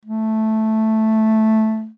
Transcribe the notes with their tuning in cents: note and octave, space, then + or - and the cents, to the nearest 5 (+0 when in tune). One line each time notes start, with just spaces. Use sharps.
A3 -5